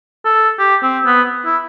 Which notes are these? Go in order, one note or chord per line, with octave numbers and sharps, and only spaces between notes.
A4
G4
C4
B3
E4